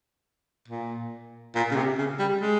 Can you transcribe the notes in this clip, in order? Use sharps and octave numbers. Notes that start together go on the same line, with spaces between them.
A#2
A#2
C#3
C3
C#3
G3
G#3